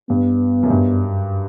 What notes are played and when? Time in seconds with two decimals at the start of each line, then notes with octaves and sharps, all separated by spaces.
0.09 G2 B3
0.63 F#2
0.70 G2